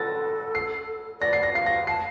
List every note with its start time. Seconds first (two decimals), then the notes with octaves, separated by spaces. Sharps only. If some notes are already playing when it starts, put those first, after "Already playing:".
Already playing: A4 A6 A#6
0.55 C7
1.21 D5 A#6
1.33 C7
1.43 A#6
1.54 F5 C7
1.66 A#6
1.87 A5 C7